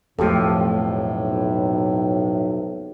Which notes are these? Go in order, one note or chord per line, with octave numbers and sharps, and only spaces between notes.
B1 F2 A2 C3 F3 A3 G4 A4